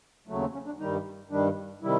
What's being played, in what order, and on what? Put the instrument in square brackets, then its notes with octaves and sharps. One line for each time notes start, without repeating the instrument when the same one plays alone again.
[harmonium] D#2 C#3 F#3 A3
C4
C#4
D4
G2 D#3 G3 D#4
G2 D#3 G3 D4
C3 D#3 G3 E4